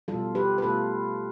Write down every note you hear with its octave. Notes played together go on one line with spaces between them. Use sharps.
B2 G3 F4 A4
G4 B4
B4
B2 A3 F4 A4